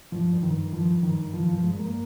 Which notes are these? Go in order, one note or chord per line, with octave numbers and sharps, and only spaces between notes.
G2 F3
G2
D#3
G2
G2 F3
G2
D#3
G2
G2 F3
G2 F3
G#3
G2
A#3